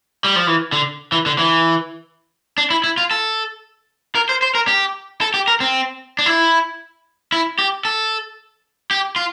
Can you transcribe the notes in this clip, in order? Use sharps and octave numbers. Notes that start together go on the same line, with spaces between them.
G3
F3
E3
D3
E3
D3
E3
D4
E4
E4
F4
A4
A#4
C5
C5
A#4
G4
A4
G4
A#4
C4
D4
E4
E4
G4
A4
G4
F4